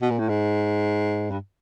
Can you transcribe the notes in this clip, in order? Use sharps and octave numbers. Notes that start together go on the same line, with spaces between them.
B2
A#2
A2
G#2
G2